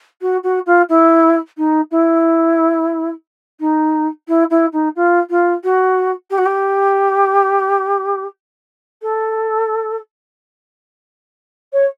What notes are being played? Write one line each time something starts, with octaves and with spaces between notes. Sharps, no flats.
F#4
F#4
F4
E4
D#4
E4
D#4
E4
E4
D#4
F4
F4
F#4
G4
F#4
G4
A4
C#5